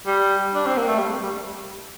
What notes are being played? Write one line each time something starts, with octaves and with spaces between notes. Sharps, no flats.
G3
D4
C4
A#3
A3
G3
G3